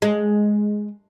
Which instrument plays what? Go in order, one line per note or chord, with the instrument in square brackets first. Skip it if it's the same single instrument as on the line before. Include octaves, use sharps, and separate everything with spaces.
[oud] G#3